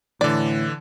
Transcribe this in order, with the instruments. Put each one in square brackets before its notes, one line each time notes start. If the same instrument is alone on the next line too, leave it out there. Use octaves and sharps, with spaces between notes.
[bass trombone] A2 [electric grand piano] D3 E3 [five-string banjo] D5